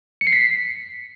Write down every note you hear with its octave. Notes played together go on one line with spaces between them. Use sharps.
C#7
C7
B6